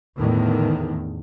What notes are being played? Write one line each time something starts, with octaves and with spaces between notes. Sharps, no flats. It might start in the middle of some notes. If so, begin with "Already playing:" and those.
E2 A2 D3 D#3